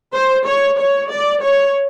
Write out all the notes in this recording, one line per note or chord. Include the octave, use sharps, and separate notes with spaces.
C5
C#5
C#5
D5
C#5